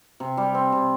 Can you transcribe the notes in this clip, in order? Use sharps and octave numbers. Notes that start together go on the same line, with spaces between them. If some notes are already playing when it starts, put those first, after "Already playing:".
C3
G3
C4
C3